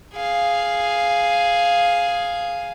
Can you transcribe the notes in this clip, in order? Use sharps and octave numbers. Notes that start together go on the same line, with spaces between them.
G#4 F5